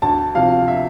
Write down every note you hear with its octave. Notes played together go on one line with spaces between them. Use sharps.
D2 A5
C3 F3 F5
E5